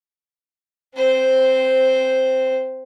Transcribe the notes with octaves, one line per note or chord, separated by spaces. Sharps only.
C4 C5